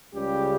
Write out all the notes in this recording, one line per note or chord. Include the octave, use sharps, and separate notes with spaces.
C#2 C#3 G3 G4